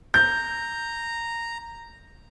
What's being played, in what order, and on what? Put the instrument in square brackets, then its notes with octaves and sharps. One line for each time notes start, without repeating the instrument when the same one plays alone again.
[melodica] A#5 [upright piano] G6